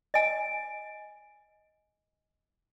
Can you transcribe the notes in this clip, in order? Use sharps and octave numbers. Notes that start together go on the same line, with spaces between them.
D#5 G#5